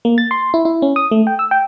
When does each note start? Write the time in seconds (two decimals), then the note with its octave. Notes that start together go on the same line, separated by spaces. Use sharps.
0.05 A#3
0.18 A6
0.31 C6
0.54 E4
0.65 E4
0.82 C#4
0.96 D#6
1.11 A3
1.27 G5
1.39 E6
1.51 G5